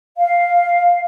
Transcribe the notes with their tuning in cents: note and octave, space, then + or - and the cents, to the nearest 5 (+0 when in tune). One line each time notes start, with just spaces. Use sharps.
F5 +5